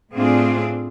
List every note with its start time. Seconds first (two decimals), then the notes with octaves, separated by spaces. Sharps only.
0.15 A2 A3 C4 D4 F4 G#4